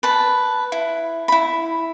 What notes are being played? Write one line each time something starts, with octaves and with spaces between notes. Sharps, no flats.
B4 A5
E4
E4 B5